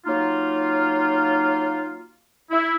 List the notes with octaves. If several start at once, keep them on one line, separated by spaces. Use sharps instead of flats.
F#3 A#3 D#4 F4
E4